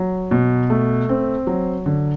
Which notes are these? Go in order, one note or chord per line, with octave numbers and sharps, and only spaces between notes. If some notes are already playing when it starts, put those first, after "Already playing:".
Already playing: F#3
B2
A3
C4
F#3
D3